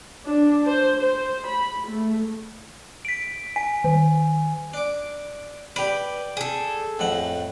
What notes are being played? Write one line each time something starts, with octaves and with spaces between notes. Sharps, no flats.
D4
C5
C5
B5
A3
B6 D7
G#5 B6
D#3
D4 D6
G4 B4 D5
G#4 A4
F2 A2 F#5